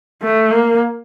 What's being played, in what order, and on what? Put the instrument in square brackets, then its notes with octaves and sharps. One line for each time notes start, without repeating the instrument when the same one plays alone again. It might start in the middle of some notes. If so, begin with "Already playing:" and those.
[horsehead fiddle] A3
A#3